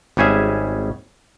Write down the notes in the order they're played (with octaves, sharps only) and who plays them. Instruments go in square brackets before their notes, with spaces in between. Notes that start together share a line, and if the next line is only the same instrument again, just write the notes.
[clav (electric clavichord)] G#1 G3 C#4 G#4 E5